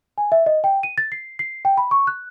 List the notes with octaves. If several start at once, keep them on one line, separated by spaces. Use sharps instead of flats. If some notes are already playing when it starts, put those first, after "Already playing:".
G#5
E5
D#5
G5
D#7
A6
C7
C7
G5
B5
C#6
F#6